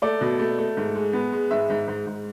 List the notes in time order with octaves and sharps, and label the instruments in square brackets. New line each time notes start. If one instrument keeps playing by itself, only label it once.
[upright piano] A3 D5
B2
A3
A3
G#2
G#3
B3
G#3
G#2 E5
G#2
G#2
G#2